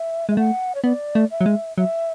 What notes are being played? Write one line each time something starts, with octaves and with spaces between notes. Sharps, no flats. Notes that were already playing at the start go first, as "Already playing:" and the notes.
Already playing: E5
G#3 E5
A3 F#5
C#5
B3 D5
A3
E5
F#3
G#3
F#3 E5